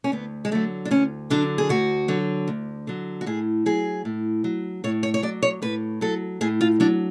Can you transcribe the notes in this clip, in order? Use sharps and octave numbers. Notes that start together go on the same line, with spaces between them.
C#4
D2 B3
G#3
D3 F#3 A3
D4
D2 C#4
D3 F#3 D4
G#4
D2 F#4
D3 F#3
D2
D3 F#3
F#4
A2 G#4
F#3 G#4
A2
F#3
A2 C#5
C#5
C#5
F#3 D5
C#5
A2 B4
F#3 A4
A2 G#4
F4
F#3 D4